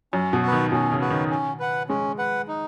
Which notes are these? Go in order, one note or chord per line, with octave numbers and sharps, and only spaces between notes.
F#2 C#4
B2
F#4
D#3 B4
B2 C#4
C#3
F#4 B4
D#3
C#4
B4 F#5
G#3 C#4
B4 F#5
D#4